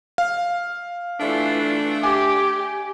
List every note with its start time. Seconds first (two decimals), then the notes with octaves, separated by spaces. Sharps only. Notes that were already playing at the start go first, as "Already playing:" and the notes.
0.18 F5
1.20 E3 A3 D4 F4
2.03 G4 G#5 D6